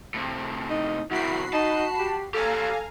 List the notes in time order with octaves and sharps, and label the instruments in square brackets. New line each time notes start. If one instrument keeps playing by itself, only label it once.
[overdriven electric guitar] A2 C3
[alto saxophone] D#4
[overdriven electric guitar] C2 D#3 [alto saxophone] E4 [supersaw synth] F#4 B5 C7
[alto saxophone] D#4 [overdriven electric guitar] A5
[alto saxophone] G4
[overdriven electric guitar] G4 C#5 [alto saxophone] A4 [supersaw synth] F5 G#5 A#5